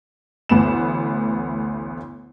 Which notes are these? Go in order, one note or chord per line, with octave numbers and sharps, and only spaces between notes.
A1 D2 B3 E7